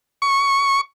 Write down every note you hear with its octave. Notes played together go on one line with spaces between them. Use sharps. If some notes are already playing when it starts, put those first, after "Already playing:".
C#6